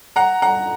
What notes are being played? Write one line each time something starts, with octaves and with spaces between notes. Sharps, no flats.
F#5 A#5
F#5 A#5